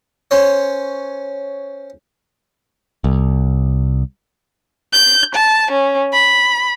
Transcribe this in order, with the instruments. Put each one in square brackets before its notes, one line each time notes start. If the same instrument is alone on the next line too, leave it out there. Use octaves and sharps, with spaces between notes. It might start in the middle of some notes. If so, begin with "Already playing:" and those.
[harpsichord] C#4 C5 C#5
[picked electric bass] C2
[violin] G6
A5
C#4
B5